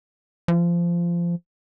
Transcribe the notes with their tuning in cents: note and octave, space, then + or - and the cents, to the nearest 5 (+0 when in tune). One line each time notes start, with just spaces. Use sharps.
F3 -20